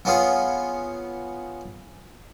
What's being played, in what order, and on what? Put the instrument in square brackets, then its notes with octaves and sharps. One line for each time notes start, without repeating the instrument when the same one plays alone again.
[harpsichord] B3 C#4 F4 G#4